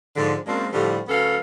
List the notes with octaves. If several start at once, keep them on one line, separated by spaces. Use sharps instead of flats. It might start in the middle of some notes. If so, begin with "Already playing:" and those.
G#2 D3 F3
F#2 G#3 A#3 C4 D4
A2 D3 F3 G3
D2 F#3 B3 C#4 A4 F5